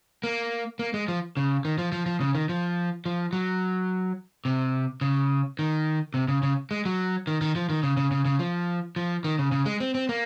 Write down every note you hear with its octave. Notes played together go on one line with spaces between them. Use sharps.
A#3
A#3
G#3
F3
C#3
D#3
F3
F3
F3
C#3
D#3
F3
F3
F#3
C3
C#3
D#3
C3
C#3
C#3
G#3
F#3
D#3
D#3
F3
D#3
C#3
C#3
C#3
C#3
F3
F3
D#3
C#3
C#3
G#3
C4
C4
A#3